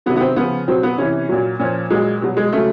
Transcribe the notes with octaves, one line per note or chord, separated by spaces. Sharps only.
C3 D#3 F#3 B3
B3
C4
C#3 F3 B3
B2 F#3 C4
B3
C3 E3 C#4
A#2 F#3
A#2 F3 C#4
A#2 F#3 G#3
B2 F#3 G3
G#3
C#3 F#3 A3